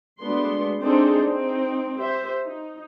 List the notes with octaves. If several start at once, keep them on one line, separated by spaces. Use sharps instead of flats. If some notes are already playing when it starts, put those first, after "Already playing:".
G#3 A3 B3 D4 F#4 C6
C4 D4 D#4 G#4 A4 C5
C4 D#4
G4 C5 E5
D#4